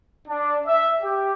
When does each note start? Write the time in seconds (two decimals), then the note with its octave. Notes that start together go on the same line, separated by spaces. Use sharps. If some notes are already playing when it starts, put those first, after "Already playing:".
0.28 D4
0.66 E5
1.02 G4